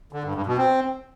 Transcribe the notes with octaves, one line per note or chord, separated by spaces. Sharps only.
D3
G2
G2
B2
C4